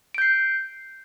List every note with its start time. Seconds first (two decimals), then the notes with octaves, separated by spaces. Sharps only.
0.14 D7
0.18 G6
0.22 C7